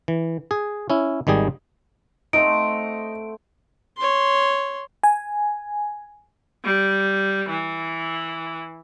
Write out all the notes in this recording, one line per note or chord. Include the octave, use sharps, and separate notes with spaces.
E3
G#4
C#4 E4
G#1 D#3 G3 G#4
A3 C4 D#4 F#5 D7
C#5 C6
G#5
G3
E3